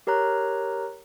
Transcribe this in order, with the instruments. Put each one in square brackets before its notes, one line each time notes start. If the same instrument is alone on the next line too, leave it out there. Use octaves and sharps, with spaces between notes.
[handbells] G4 A#4 C#5 A#5 F#6